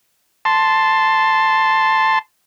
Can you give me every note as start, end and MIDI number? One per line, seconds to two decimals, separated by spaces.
0.45 2.19 81
0.45 2.19 84